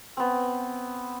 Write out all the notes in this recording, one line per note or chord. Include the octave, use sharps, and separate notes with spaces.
B3 C4